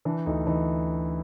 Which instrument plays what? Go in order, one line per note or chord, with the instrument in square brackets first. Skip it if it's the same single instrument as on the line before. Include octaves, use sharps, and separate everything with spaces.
[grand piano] E3 D4
D2 D#4
E3 D#4